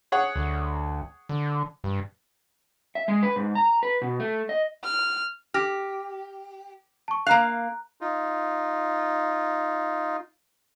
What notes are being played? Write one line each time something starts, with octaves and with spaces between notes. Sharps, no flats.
G#4 C#5 F#5
D2
D3
G2
E5
G#3
B4
G#2
A#5
B4
B2
A3
D#5
F6
G4 F6 A#6
A5 C#6
A#3 F5 A#5 F#6
D#4 F4